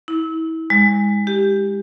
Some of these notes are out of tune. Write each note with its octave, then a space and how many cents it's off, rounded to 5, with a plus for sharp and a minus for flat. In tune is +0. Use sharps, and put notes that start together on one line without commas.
E4 -30
G#3 -25
G4 +5